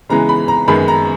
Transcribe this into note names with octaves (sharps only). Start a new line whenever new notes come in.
C#3 E3 G#3 B3 A#5
B5
A#5
F#2 D#3 G#3 B3 B5
A#5